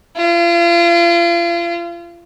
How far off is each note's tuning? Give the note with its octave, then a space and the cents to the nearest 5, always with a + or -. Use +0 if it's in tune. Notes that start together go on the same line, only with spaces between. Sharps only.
F4 -35